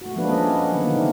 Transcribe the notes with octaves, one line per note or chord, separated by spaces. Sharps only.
A3 F#4
F3 G#3 A#3 D4 B4
C#4 A4 D#5
C#4 F#5
D3 D#3 F#3 A#3 B3 B4
C#3 A3 C4 D#4